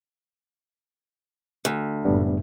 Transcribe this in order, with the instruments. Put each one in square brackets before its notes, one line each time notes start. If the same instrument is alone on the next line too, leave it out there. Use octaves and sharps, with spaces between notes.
[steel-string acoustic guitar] D2
[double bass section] F#1 F#2 A2 [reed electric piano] G3 B3 D4